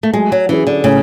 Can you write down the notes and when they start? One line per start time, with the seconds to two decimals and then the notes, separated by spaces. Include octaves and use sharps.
0.03 A3
0.14 F#3 G#3
0.32 F#3
0.49 E3 C#4 G#4
0.67 D3
0.84 A2 C#3